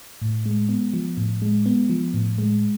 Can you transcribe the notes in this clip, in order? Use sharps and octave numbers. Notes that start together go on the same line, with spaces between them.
A2
G#3
B3
F3
A2
G#3
B3
F3
A2
G#3